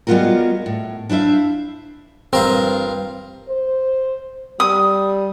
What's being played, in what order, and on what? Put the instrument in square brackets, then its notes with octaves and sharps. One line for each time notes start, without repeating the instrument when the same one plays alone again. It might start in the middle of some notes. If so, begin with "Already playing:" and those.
[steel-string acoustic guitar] G3 G#3 B3 F4 F#4 A#4
A2
D4 E4 C5 E5 F5
[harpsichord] G2 F4 A#4 [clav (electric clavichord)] C4
[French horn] C5
[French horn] G3 [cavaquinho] D#6